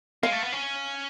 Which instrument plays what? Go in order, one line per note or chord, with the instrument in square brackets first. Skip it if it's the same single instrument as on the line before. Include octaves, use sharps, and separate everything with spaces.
[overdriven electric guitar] G#3 [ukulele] F5
[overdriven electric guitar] A3
B3
C#4